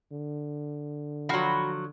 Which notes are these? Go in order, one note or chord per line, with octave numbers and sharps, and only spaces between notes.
D3
F3 F#3 F#4 B5